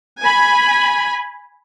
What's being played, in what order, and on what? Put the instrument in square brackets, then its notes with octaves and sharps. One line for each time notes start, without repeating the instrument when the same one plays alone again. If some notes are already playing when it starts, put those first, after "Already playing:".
[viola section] G#5 B5